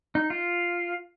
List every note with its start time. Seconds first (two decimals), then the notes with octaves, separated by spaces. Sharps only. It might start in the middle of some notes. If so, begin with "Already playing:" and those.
0.15 D#4
0.30 F4